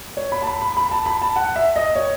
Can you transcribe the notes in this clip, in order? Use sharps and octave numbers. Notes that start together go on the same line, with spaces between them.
C#5
B5
A5
B5
B5
B5
A5
B5
A5
F#5
E5
D#5
C#5